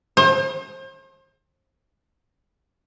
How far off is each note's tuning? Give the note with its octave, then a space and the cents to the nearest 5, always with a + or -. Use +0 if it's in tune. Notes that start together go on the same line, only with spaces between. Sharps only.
C5 +35